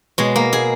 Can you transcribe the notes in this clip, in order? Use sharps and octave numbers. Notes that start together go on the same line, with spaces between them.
B2 G#3
A#3
G#4